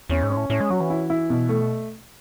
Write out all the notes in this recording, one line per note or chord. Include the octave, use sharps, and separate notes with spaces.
E2 C#4
G#2
C#4
A2
A2 C#4
G#3
F#3 F#4
E3
E4
E4
B2
A3